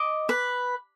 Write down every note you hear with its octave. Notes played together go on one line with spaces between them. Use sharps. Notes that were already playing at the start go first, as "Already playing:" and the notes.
Already playing: D#5 D6
B4